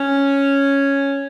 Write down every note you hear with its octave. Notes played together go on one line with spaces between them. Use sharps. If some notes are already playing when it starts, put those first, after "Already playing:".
Already playing: C#4